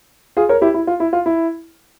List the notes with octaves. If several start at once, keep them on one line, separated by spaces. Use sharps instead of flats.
F4 G#4
A#4 C#5
E4 G4
E4
F4
E4
F4
E4